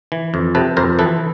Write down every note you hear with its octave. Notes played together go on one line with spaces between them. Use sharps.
E3
F2
C3 A4 B4
F2 A#4 C5
E3 A4 B4